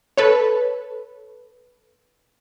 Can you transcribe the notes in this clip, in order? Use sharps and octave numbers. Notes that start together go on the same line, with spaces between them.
A4 B4 C#5